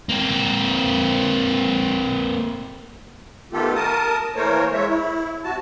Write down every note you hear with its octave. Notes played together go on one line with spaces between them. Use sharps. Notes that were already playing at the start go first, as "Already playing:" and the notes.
A#3 C4
D#3 A3 B3 F4 G4 A4
A#4 A5 D#6
E3 A3 A#3 A#4 C5 C#5
G#3 C#5 E5
E4
C3 F#4 A5